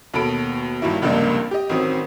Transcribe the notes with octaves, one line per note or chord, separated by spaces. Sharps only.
D#2 B2 A4 B5 D7
G2 A#2 D#3 F#3 A#3 E4
F1 C#2 G2 A#2 A#3 D4
G4 D#5
A1 D#3 F#3 C4 D#6